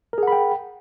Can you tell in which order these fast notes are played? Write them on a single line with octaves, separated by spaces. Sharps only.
A#4 G#4 F#5 B5 G5